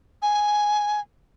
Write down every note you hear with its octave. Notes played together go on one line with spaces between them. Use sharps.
G#5